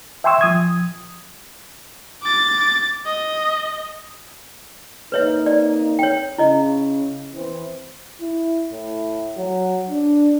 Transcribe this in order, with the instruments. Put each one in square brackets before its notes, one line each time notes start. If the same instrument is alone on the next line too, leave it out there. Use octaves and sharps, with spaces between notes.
[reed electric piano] E5 G5 G#5 C6 C#6 E6
F3 D#6 G#6
[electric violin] D6 A6
D#5
[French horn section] A#3 C4 D#4 [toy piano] B4 C#5 E5
[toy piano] D5
C#5 G5
[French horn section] C#3 [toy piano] E4 D#5
[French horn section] E3 C4
[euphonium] E4
A2
F#3
D4